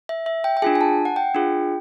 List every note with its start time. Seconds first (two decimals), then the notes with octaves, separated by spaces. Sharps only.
0.09 E5
0.26 E5
0.44 G5
0.57 G5
0.62 D4 F4 G#4 G#5
0.75 G#5
0.81 A5
1.05 F#5
1.16 G5
1.35 D4 F4 G#4